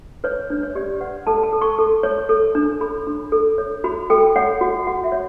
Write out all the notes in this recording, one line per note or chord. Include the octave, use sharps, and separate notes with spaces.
B4 C#5
D4
C#5
G4 D5
B4 F#5
A4 A5
A5
A4
C#6
A4
C#5
A4
D4
A4 B5
D4
A4
C#5
F#4 B5
A4 G5
C#5 F#5
F#4
F#4 F#5
E5
C#5